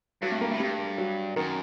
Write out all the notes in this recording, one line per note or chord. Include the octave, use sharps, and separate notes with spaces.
G2 F#3
A3
A#3
A3
A2
G2 G3
F#3
F#2 D#3